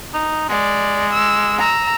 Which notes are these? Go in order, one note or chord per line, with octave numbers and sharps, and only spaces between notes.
D#4
G#3 D5
E6
A#5 E6